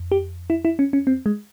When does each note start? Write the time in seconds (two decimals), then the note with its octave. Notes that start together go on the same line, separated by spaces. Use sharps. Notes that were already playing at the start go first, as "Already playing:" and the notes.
Already playing: F2
0.12 G4
0.50 E4
0.65 E4
0.79 C#4
0.93 C#4
1.07 C4
1.26 G#3